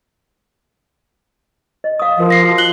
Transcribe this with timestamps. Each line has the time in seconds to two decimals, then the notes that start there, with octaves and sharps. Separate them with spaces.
1.84 D#5
2.00 F5 D#6
2.18 F3 A#4 F5
2.30 A#6 C7
2.44 F#4
2.58 F4 F#6 F#7 G7